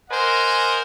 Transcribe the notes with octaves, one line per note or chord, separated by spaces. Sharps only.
A#4 C5 D#5 F#5 G#5